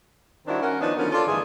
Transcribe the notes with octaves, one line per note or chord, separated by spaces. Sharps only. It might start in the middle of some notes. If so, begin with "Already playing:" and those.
D#3 G3 C4 D4 E4 F#4
C#4 A#4 F#5
D#3 F3 B3 D4 D#4 F4
D3 F3 F#3 B3 C#4 A#4
F4 A4 D5
D2 G2 D#3 E3 A3 G#4